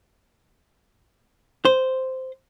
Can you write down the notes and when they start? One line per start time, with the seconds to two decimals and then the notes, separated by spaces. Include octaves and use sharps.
1.65 C5